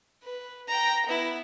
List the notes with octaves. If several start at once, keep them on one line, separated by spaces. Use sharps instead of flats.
B4
G5 A#5
B3 E4